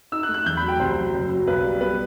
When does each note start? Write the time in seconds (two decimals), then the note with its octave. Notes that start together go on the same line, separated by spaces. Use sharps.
0.12 D#4 E6
0.23 F#6
0.29 A3
0.34 F#6
0.46 E2 G6
0.57 B5
0.63 F#3
0.68 G5
0.79 C2 C5
0.96 F#3
1.14 F#1
1.30 F#3
1.47 B1 B4
1.64 G3
1.81 B3 B4